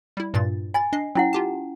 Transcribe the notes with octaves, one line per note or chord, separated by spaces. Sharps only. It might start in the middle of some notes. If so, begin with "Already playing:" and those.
G3 E4
G2 A#2 A6
G#5 B5 A6
D4 D#5 C7
F#3 C#4 E4 F#5
F4 G4 A5